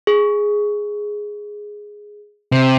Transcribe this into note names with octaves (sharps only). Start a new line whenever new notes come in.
G#4
C3